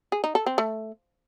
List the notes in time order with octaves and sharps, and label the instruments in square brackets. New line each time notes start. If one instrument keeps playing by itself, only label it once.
[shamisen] G#4
D#4
A4
C4
A3